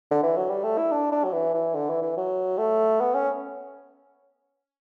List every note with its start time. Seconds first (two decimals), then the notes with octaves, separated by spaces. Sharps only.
0.11 D3
0.23 E3
0.37 F#3
0.50 G3
0.64 A3
0.78 E4
0.91 D4
1.12 D4
1.24 F#3
1.33 E3
1.54 E3
1.75 D3
1.89 E3
2.02 E3
2.17 F#3
2.58 A3
3.00 B3
3.14 C#4